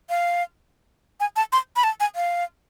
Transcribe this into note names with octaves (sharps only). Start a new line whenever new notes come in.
F5
G#5
A5
C6
B5
A5
G#5
F5